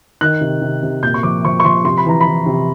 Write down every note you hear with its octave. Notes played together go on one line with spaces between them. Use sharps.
D#3 F#6
C3
C3
C3
A#2 G6
C#6
F3 D6
F3 C#6
C#6
F3 C6
C3 C6
B5
E3 A#5
B5
E3
C3